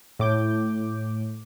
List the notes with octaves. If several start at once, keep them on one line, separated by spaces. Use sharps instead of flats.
A2 D6 G6